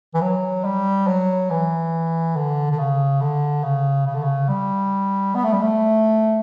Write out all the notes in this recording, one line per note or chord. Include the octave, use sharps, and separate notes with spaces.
E3
F#3
G3
F#3
E3
D3
D3
C#3
D3
C#3
C#3
D3
C#3
G3
B3
A3
G3
A3